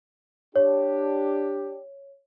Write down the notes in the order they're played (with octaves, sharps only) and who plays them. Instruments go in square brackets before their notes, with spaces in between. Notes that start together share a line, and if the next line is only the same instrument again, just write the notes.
[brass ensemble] D4 G4 [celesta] C#5